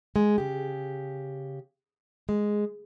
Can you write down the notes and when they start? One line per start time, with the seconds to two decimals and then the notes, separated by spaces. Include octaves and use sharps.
0.16 G#3
0.38 C#3 G4
2.29 G#3